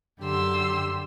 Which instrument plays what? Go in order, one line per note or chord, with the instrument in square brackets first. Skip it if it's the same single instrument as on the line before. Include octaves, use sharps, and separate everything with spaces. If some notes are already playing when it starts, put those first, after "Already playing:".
[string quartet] F#2 D3 G4 C6 E6